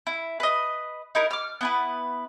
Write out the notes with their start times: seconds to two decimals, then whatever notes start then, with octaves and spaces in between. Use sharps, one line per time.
0.07 E4
0.40 B4 D#5
1.15 D#4 E4 A#4
1.31 D6 F6
1.61 B3 E4 B4